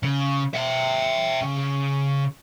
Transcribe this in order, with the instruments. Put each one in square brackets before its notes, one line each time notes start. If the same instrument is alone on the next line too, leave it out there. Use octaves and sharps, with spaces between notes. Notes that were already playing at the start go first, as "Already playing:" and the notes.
[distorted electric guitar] C#3
E5 G5
C#3